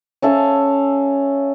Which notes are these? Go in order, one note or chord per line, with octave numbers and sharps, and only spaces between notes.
C#4 A4 E5 F5